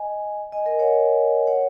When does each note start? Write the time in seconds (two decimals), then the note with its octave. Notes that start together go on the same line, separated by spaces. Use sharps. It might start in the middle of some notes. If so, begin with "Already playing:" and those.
Already playing: D#5 G#5
0.52 D#5 G#5
0.66 A#4 D#5
0.79 C#5 F#5
1.47 C#5 F#5